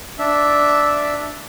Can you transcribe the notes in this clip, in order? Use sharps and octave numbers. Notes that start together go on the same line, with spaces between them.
D4 E5